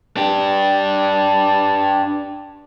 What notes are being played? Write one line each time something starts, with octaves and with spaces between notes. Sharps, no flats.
D4 G4